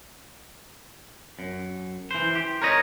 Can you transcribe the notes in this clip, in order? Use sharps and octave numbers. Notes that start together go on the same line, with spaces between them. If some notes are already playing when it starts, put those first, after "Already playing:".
F#2
E3 C5
G4
A#4 C#5 D#5